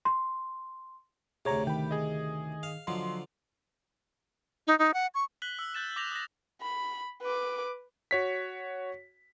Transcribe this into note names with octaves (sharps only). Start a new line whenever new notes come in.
C6
D2 C3 G#4 C#5 A#5
D#3 G5 B5
G#4 D#5
F5
D3 F3 F#3 D#5 C6
D#4
D#4
F#5
C#6
F#6 B6 F#7 G7
E6
F#6 G6 A6 E7
D6 E6 G6 A#6 E7 F7
D#6 A#6
B5
B4 D6
F#4 C#5 B6